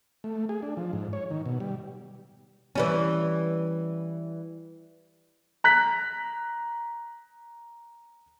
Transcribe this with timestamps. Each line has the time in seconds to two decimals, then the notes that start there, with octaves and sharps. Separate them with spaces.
0.24 A3
0.49 G#4
0.62 D4
0.77 F3
0.93 G#2
1.13 C#5
1.31 D#3
1.46 B2
1.60 G3
2.75 E3 G3 C#4
5.64 A#5 F#6 B6